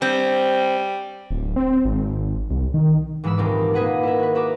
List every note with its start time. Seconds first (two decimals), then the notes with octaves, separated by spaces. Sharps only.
0.02 G3 C4
1.30 D1
1.56 C4
1.85 G#1
2.50 C2
2.74 D#3
3.24 G#2 E3 G#3 B5 E6
3.38 D#1 C2 A#4 D5 D6
3.74 A#3 G#4 B4 D#5 F#5
4.03 E4 A#4 E5
4.20 F#4 B4
4.35 F#4 B4 E5 A#5 D6